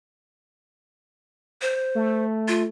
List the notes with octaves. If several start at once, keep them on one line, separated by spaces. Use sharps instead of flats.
C5
A3
F4